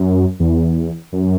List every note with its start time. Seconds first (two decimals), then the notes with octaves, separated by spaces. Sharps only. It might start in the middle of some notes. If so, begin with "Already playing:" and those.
Already playing: F#2
0.40 E2
1.13 F#2